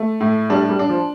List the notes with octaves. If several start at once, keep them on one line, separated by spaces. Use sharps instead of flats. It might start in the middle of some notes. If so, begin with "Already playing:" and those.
Already playing: A3
A2
G3 D4
G3
D4
F3